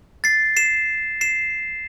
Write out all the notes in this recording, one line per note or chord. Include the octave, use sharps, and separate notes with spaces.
A6 C7
C7 E7
C7 E7